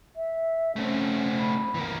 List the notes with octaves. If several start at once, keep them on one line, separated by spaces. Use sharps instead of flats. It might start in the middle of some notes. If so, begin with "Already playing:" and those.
E5
A3 C4 C#4
B5
E3 A#3